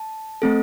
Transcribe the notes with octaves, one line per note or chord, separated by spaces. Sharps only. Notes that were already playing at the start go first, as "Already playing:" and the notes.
Already playing: A5
A3 C4 A4